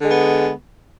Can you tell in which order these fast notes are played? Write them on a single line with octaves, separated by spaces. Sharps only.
D3 G#3 B3